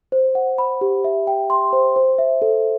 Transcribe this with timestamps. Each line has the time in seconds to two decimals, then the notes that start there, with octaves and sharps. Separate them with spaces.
0.12 C5
0.35 F#5
0.58 B5
0.81 G4
1.04 E5
1.27 G5
1.50 C6
1.73 C5
1.96 C5
2.19 E5
2.42 A4